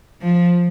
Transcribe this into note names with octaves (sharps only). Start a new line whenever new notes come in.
F3